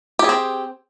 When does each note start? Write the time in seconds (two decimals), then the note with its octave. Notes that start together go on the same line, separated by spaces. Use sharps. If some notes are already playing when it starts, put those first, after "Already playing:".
0.19 G4
0.24 G#4
0.29 C4